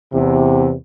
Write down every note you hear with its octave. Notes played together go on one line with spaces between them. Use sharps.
E2 C3